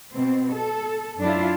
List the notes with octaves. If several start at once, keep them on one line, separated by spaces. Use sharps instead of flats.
B2 C4
A4
F#2 D4 E4 F4